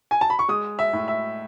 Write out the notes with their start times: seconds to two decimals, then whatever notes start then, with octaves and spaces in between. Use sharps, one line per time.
0.11 G#5
0.21 A5
0.30 B5
0.39 C#6
0.48 G#3 D#6
0.79 E5
0.93 A2
1.08 E5